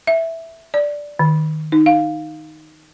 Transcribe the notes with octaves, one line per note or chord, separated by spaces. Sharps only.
E5
D5
D#3
D#4
F5